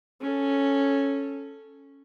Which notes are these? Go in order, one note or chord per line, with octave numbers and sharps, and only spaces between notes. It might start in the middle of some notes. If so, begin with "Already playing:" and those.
C#4 A4